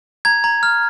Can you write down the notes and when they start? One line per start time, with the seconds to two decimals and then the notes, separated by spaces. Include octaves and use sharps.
0.25 A#5 G#6
0.44 A#5
0.63 F6